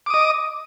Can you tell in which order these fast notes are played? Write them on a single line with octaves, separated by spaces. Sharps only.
D6 D#6 D#5